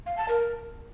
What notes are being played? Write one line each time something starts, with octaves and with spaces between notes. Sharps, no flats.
F5
A5
A#4